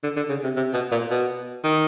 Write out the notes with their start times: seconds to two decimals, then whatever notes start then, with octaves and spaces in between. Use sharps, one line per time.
0.03 D3
0.16 D3
0.29 C#3
0.44 C3
0.56 C3
0.74 B2
0.92 A#2
1.11 B2
1.64 D#3